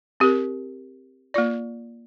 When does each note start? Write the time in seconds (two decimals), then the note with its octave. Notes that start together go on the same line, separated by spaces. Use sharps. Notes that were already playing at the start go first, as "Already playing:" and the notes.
0.20 C4 G4 A#4
1.34 A#3 F4 D5